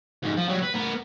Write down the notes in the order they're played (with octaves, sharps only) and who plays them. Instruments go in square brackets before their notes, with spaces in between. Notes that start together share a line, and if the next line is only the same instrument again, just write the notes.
[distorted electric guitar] D2 G#2
F3
F#3 G3
B4
B3 A#4